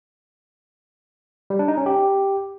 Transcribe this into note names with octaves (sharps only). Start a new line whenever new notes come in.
G3
D4
D#4
C#4
G4